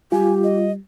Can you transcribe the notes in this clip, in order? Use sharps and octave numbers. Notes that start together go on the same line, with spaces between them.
G3 F4 G4 G#5
D#5